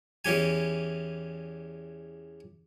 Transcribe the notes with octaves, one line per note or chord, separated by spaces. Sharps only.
E2 E3 C#4 G4 G#5